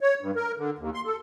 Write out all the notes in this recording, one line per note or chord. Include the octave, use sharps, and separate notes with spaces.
C#5
G2
A#4
D3
D#2
C6
A4